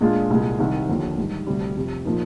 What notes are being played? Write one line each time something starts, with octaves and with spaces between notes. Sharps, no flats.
A#2 G#3 D4 F4
C2 A#2 G#3
C2 C3 D#3
D#2 D3 F3
G#2 D#3 G3
D2 C3 G3
F2 C3 F3
A#2 F3 A#3 D#4